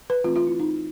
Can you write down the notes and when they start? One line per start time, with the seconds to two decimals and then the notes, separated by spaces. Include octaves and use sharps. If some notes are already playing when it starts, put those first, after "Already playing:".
0.10 B4
0.24 E3 A3 C4 F4
0.36 F4
0.47 E4
0.60 D#4